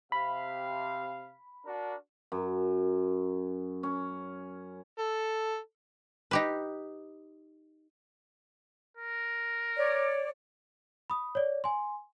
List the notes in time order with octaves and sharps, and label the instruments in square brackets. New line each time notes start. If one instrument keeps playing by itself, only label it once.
[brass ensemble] C3 F5 [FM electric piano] B5
[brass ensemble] D4 F#4 A#4
[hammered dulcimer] F#2
C#4
[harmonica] A4
[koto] D#4 G4 B4
[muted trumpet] A#4
[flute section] C#5 D5
[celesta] B5 D#6
C#5 D5
G#5 C6